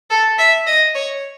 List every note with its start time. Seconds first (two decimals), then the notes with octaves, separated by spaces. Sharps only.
0.10 A4
0.39 E5
0.67 D#5
0.95 C#5